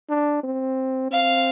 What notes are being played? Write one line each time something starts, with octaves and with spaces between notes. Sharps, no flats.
D4
C4
C4 F5